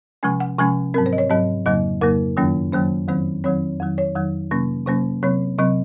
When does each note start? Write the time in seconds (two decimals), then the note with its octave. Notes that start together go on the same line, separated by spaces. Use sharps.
0.23 C3 F3 G#3 C#4 G#5
0.40 F#5
0.58 C3 F3 G#3 C#4 G#5
0.94 G#2 F#3 C4 A#4
1.06 C5
1.13 D#5
1.18 C#5
1.30 G#2 F#3 C4 D#5
1.66 F2 C#3 F#3 A#3 D#5
2.02 F2 C#3 F#3 A#3 A#4
2.37 F#2 D#3 F#3 A#3 C#4
2.73 F#2 D#3 F#3 A#3 C#4 C5
3.08 F2 D#3 F#3 C4 C5
3.44 F2 D#3 F#3 C4 C#5
3.80 F2 D#3 F#3
3.98 C#5
4.16 F2 D#3 F#3
4.51 C3 F#3 A#3 C#4
4.87 C3 F#3 A#3 C#4 C5
5.23 C3 F#3 C4 C#5
5.58 C3 F#3 C4 D#5